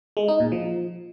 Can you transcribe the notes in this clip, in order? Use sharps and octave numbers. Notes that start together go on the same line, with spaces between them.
G#3
D#4
A#2
F3